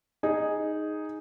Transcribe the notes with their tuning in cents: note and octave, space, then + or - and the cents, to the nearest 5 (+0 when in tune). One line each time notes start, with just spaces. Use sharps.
D#4 +0 G#4 +0